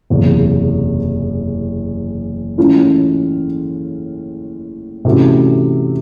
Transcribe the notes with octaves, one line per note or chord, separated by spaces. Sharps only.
F#1 E2 C3
A2 E3 G#3 C#4 F4
C3 E3 A3 C#4 F#4